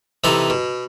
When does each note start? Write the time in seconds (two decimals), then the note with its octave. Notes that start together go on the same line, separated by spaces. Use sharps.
0.24 C3 E3 D#4 A4
0.50 B2